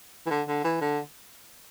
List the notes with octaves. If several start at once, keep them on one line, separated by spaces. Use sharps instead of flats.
E3
D3
D3
E3
D3